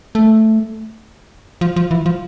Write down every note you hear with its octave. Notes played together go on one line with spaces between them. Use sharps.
A3
F3
F3
E3
F3